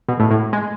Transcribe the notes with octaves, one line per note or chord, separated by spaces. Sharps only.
B2
A2
A2
G#3